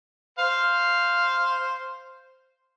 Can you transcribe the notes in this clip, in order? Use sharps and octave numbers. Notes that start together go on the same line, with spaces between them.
C5 F5